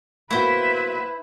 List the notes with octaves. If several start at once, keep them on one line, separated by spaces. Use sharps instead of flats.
A#3 B3 E4 F#4 B4 C5 E5